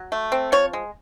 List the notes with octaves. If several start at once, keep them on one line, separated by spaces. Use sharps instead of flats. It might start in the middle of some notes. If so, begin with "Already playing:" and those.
Already playing: F#3
A3
C4
F3 C#5
G#3